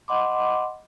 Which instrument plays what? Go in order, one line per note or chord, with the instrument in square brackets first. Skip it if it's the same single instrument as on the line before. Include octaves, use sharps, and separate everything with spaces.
[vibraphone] D#5 F#5 B5 C6 D6